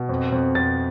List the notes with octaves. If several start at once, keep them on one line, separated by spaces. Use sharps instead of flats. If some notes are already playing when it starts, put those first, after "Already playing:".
Already playing: B2
F2
F2
F2 A6